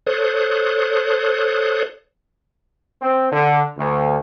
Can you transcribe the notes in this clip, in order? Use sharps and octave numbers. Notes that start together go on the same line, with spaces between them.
A4 C5 C#5 D#6 F#6
C4
D3
D2